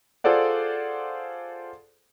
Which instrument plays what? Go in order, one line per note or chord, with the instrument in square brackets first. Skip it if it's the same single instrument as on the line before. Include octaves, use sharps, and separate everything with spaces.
[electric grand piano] F4 G#4 A4 C5 D5 F#5